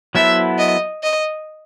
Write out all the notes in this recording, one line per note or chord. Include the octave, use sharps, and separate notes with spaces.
F#3 B3 E4 A4 C5 E5
D#5
D#5